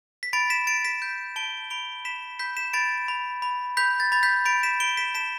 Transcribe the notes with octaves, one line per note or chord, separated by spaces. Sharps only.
B6
B5 A6 D7
B6 E7
B5 A6 D7
B6 E7
G6
A5 D7 G7
B5 D7 G7
B5 B6 E7
B5 G6 B6
B6 E7
B5 A6 D7
B5
B5
B5 G6 B6
A6
B5 A6
G6 B6
B5 A6 D7
B6 E7
B5 D7 G7
B6 E7
A5 B6 E7